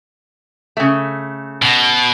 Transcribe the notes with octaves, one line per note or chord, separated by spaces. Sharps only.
C#3 A3
B2